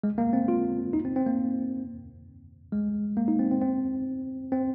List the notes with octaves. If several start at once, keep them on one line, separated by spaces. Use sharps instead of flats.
G#3
A#3
C4
F4
D#4
C4
C4
A#3
G#3
A#3
D#4
C4
C4
C4
C4